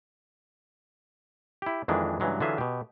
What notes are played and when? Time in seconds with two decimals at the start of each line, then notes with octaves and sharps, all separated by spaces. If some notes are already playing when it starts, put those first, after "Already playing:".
1.62 E4 G4
1.88 F2 D#3 E3 G#3 D4
2.20 G2 C#3 E3 F#3 G#3
2.40 D3 E3 F#3 F4 G#4 E5
2.58 B2 G4